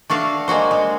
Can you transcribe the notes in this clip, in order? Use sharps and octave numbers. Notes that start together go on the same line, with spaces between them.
A3 D4 F#4 F5
G#3 A#3 F#4 C5
G#3